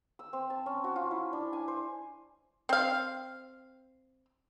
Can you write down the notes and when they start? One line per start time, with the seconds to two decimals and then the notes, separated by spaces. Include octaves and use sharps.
0.19 E6
0.33 C4
0.50 A5
0.66 C#4
0.84 F#4
0.96 F4
1.11 E4
1.33 D4
1.53 G#5
1.68 C5
2.69 C4 F5